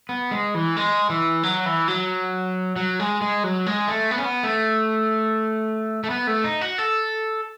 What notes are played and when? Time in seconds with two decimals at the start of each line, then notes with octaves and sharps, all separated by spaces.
0.09 B3
0.31 G#3
0.55 E3
0.76 G#3
1.10 E3
1.43 F#3
1.66 E3
1.88 F#3
2.76 F#3
3.00 G#3
3.22 G#3
3.43 F#3
3.66 G#3
3.88 A3
4.11 B3
4.18 C#4
4.24 B3
4.43 A3
6.04 A3
6.10 B3
6.27 A3
6.44 D#4
6.61 F#4
6.78 A4